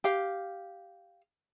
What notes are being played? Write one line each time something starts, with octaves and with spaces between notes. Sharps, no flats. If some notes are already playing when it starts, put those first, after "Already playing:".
G4 F5